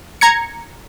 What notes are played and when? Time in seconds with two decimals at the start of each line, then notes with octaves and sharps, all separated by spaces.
0.21 A#5 G#6 C#7